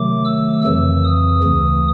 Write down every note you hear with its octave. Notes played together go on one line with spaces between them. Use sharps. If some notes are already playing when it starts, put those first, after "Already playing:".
Already playing: C3 D#3 F#3 A3 D6
E6
F2 C#3 E3 E6
D#6
D2 C#3 E3